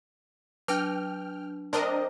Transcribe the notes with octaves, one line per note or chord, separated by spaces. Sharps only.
F#3 D4 G5 F6
C4 D4 A#4 D#5